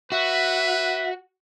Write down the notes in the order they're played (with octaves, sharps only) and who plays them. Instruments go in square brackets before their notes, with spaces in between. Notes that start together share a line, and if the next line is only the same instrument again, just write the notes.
[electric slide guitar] F#4 [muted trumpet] B4 [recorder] E5